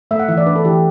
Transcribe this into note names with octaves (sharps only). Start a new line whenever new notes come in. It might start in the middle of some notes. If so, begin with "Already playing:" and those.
A3 E5
F#5
E3 E5
D5
D4 B4
A4
E3 G4